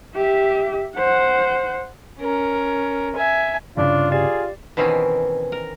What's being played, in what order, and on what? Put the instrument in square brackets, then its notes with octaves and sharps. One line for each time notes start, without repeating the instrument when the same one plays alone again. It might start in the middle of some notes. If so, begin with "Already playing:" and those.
[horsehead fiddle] G4 E5
C5 F#5
[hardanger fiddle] C#4 A#4
E5 G#5
[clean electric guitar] C2 G2 C#3 [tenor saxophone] D4 [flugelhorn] F4
[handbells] G4 D5 [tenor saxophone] G#4
[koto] B2 D#3 E3 C4 C#4
A#4